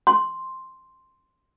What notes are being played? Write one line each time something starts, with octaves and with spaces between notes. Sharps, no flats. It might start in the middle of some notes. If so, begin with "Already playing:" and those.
C6